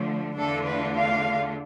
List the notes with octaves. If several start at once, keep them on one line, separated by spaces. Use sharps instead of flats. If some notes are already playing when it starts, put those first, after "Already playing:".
Already playing: D3 F3 A3
E2 D3 A3 D4 F4 A4
B4
F5